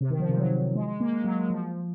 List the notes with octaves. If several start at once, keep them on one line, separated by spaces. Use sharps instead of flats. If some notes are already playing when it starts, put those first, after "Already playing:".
C3
D#3
F3
C3
F#3
G#3
G#3
A#3
G#3
F#3
G#3
F3